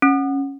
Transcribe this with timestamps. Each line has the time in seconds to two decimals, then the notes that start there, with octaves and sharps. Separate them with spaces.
0.02 C#4